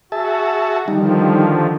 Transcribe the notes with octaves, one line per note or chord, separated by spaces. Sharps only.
F#4 G#4 E5 A5
D3 D#3 F3 G3 D#4